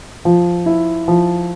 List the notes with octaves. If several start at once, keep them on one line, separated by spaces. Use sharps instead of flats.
F3
E4
F3